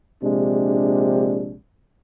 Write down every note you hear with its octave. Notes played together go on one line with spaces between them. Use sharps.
A#1 C3 G#3 D4